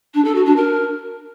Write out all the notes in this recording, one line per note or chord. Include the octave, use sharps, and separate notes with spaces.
D4
A4
F#4
D4
A#4